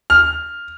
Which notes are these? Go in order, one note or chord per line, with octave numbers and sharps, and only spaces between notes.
F6